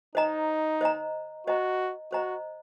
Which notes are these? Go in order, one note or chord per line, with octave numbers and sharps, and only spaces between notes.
D#4 C5 D#5 A#5
C5 D#5 A#5
F#4 C5 D#5 A#5
F#4 C5 D#5 A#5